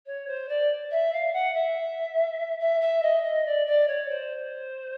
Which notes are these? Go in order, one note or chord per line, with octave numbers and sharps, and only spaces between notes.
C#5
C5
D5
E5
F5
F#5
E5
E5
E5
D#5
D#5
D5
D5
C#5
C5